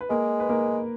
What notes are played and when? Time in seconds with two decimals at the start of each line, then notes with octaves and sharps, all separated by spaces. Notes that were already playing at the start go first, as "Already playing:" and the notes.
0.01 B4
0.10 G#3 A#3 A#4
0.40 B4
0.49 A#3 A#4